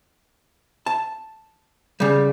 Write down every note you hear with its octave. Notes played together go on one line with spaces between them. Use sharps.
A5
C#3 G3